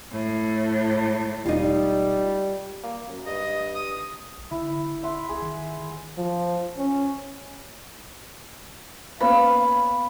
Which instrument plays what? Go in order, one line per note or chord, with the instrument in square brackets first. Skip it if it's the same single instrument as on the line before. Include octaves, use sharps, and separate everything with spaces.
[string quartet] A2
[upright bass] E1 [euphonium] G3 [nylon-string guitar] D#4 F4
[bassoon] A#3
F#2
[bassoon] G2 [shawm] D#5
[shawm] D#6
[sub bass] A#1
[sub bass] D3 [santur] E4
[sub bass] E1
[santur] E5 F#5 C6
[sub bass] C2 [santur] G#4
[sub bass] D#3
[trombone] F3
C#4
[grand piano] A#3 B3 C#4 [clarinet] F5 [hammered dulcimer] B5